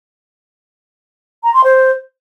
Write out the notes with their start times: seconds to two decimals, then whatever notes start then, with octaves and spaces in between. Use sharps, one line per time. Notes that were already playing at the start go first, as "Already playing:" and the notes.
1.43 A#5
1.54 C6
1.64 C5